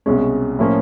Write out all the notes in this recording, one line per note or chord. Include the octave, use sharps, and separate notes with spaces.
C2 B2 G#3 C#4
A2 F3 A#3 C#4